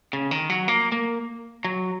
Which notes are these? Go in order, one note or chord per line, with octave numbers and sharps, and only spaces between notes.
C#3
D#3
F#3
A#3
A#3
F#3